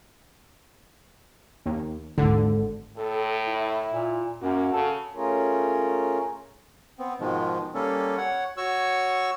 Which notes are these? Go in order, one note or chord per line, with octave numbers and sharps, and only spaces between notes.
D#2
G#1 D#2 D3
A2 A4
E4
A#2
F#2 A#3 F#4
C#3 A4
A3 C#4 F4 G#4 A#4 C#5
B3 C4
G#2 B2 D#3 F3 G#3
G3 A#3 C#4 A4
C#5 F#5
F#4 C#5 C#6 E6